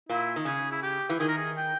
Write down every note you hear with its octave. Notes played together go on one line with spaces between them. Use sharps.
A#2 E4
D#3
C#3 G#4
E4
G4
E3
D#3 G#4
A#4
G#4
G5